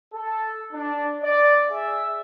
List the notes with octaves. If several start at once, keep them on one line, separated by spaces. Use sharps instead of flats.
A4
D4
D5
G#4 E5